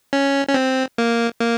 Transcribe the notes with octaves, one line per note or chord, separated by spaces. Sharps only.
C#4
C#4
C4
A#3
A#3